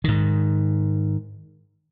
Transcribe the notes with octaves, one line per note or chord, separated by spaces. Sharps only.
G#2 D#3